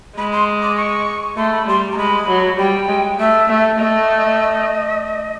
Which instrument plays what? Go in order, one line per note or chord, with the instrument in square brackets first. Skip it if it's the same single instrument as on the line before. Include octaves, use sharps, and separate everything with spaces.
[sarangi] G#3 [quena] B5
[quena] C6
D6
C#6
[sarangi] A3 [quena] C6
[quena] B5
[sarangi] G3 [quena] C6
[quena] A#5
[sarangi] G#3 [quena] B5
[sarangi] F#3
[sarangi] G3 [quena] G5
[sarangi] G#3
[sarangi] A3 [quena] E5
[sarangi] A3
[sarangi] A3 [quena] D#5